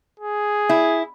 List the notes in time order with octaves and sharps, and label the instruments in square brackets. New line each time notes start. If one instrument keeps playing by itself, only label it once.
[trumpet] G#4
[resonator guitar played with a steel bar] E4